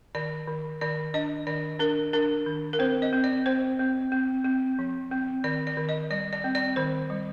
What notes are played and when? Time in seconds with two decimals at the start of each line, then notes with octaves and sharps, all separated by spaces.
0.15 D#3 D5
0.48 D#3
0.81 D#3 D5
1.14 D4 D#5
1.47 D#3 D5
1.80 D4 A#4
2.13 D4 A#4
2.46 D#3
2.73 A#4
2.79 C4 C5
3.02 D#5
3.13 C4
3.24 D5
3.46 C4 C5
3.79 C4
4.12 C4
4.45 C4
4.79 F3
5.12 C4
5.44 D#3 D5
5.67 D5
5.77 D#3
5.89 D#5
6.10 G3 D5
6.33 D5
6.44 C4
6.55 D5
6.76 D#3 C5
7.10 G3